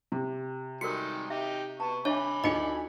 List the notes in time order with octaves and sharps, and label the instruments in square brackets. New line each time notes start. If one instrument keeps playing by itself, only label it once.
[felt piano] C3
[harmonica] D#3 G3 G#3 [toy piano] F#4 A4 A#4 [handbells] C#7
[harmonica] D#4 G4 [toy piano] E5
[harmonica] B3 C#6 [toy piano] A5 A#5
[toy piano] D4 D#5 E5 [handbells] C#5 [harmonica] G#5 B5 D6
[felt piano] D2 C#7 [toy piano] D#4 F4 G#4 [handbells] D#5